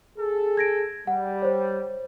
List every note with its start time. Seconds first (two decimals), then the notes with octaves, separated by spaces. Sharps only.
0.18 G#4 A4
0.57 G#6 A#6 D7
1.07 G3 F#5
1.42 C5 C#5